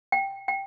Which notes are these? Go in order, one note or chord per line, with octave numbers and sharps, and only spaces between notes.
G5
G5